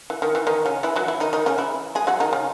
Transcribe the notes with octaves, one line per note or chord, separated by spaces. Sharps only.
E3
D#3
E3
D#3 D#4
C#3 C#4
E3 E4
F#3 F#4
E3 E4
D#3 D#4
D#3 D#4
C#3 C#4
E3 E4
G#3 G#4
F#3 F#4
D#3 D#4
C#3 C#4